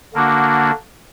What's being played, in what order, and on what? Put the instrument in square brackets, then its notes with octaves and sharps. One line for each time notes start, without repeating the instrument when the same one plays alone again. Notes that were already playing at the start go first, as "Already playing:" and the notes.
[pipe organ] D3 A#3 D4 F#4